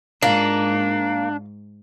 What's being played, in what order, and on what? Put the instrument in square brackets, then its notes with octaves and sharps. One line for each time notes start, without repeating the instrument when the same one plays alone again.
[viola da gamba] G#2 [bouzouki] A#3 [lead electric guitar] D4 [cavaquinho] F4